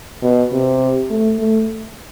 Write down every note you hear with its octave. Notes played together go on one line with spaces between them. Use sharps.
B2
C3
A3
A3